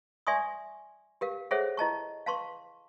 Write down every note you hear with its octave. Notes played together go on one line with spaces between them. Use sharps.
D5 E5 G#5 C6 C#6 D#6
G4 A#4 F5
G#4 A4 C5 C#5 E5 F#5
E4 D#5 A5 C#6
F5 A5 C6 C#6